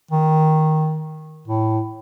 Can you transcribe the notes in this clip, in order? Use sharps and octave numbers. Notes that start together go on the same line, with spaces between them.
D#3
A2